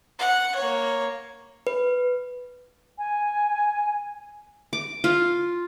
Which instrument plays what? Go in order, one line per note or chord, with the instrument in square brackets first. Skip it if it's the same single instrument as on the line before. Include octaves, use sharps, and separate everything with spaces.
[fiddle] F#5
A#3 C#5
[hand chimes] B4
[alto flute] G#5
[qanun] D6
F4